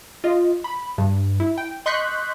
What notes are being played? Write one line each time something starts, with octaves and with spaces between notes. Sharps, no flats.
F4 D#5
B5
G2
E4
G5
D#5 C6 C#6 F#6 G6 B6